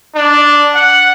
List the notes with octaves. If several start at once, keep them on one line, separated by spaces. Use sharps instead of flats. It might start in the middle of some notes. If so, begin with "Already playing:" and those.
D4
F#5